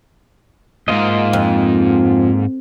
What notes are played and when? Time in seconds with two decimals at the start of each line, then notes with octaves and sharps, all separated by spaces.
0.88 C#2 G#2 A#3 F4 D#5
1.33 F2